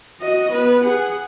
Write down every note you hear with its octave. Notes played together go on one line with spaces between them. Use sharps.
F#4 D#5
B3 B4
G#4 F#5